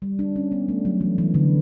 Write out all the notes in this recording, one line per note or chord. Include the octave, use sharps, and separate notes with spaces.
G3
D4
C#4
B3
A3
F#3
E3
E3
D3